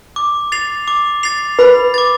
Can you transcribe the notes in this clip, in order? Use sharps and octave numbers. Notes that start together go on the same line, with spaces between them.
D6
A6 C7 F7
D6
A6 C7 F7
B4 B5
D6 A6